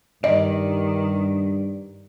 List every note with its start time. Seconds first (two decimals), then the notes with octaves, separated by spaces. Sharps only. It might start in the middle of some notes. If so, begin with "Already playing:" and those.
0.24 G2 D#3 D5 D#5